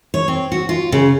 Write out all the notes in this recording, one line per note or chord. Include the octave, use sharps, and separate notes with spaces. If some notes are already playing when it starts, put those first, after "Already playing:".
C#5
C4
F#4
F4
C#3